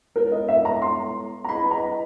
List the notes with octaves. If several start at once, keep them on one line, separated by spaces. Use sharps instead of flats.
G#3 B3 E4 A4 A#4 C#5
D#5
E5
A#5
C6
A#5
E4 G#4 B4 D#5 B5
A#5